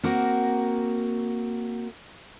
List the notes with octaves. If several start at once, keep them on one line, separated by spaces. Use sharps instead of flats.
A#3 C4 F#4 A#4